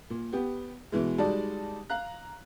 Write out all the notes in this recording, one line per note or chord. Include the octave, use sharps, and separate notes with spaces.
A#2
B3 G4
B2 E3 G#3
G3 G#3 D#4 F#4 D5 A5
F5 A#5 F#6